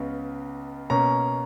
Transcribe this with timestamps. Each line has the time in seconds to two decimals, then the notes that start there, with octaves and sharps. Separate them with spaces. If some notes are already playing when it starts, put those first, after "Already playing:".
Already playing: C#2 C#3 B3
0.90 B2 A#3 C#4 A#5